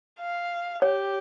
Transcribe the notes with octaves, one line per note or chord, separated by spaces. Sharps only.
F5
G4 C#5